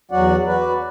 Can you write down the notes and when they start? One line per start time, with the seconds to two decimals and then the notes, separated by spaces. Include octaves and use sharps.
0.11 E2 F#3 F#4 D5 F#5
0.46 F#4 B4 D5